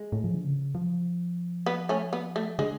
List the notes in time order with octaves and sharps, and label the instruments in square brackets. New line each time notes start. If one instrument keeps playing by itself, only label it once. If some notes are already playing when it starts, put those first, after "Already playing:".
Already playing: [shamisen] G#3
[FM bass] A2
F3
D3
C#3
F3
[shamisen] B3
A3 C#4
B3
A3
[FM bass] D3 [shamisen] G#3